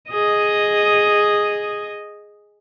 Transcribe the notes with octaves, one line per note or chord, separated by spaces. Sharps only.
G#4 D#5